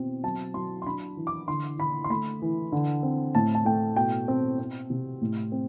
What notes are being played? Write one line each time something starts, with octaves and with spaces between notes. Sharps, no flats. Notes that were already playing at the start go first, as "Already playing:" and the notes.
Already playing: B2 C4
F#3 A5
F#3 C6
C6
D4 B5
E3
D6
D3 C6
D3 B5
C6
A3 B5
E3
D3
C4
A2 A5
A5
A3 G5
B2 G5
C4
C4
C3
A2
C4